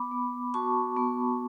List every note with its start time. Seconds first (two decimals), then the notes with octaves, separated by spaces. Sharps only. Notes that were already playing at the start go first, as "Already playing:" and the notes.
Already playing: B3 B5 D6
0.11 B3
0.54 F#4 A5 C#6
0.97 B3